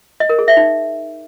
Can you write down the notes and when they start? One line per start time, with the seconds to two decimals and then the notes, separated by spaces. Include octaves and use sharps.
0.20 D#5
0.29 A#4
0.39 G#4
0.48 E5
0.57 D#4